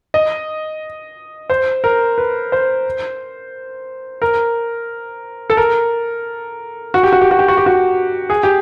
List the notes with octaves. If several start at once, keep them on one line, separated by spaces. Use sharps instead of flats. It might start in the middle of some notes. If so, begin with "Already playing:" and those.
D#5
C5
A#4
B4
C5
A#4
A4
A#4
F#4
G4
F#4
G4
F#4
G4
F#4
G4
F#4
G#4
G4